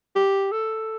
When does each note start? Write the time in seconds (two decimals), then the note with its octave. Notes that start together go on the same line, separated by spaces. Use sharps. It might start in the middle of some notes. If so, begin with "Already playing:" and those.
0.16 G4
0.52 A4